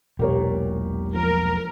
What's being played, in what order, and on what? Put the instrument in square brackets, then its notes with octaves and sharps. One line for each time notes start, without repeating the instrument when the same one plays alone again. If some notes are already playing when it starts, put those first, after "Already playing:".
[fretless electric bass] E1 B1 A#2 [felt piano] G4 A#4 C#5
[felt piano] F3 [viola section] A#4